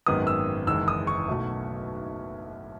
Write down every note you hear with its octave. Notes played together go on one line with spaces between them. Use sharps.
G#1 F#2 D#3 G#3 B3 D#6
E6
F#1 E2 D#3 G#3 B3 E6
D#6
C#6
B1 B2 F#3 A3